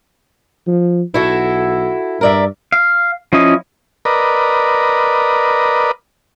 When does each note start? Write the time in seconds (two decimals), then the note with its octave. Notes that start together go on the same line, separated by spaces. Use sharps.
0.67 F3
1.14 B1 E4 F#4 A4
2.21 G2 A#4 D5 E5
2.72 F5
3.33 F3 C#4 E4 D#5
4.05 A#4 B4 D5 D#5